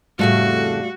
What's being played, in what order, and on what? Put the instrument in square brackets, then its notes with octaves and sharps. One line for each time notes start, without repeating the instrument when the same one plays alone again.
[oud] F2 A2 C#3 [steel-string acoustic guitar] G3 A3 F5 [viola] F#4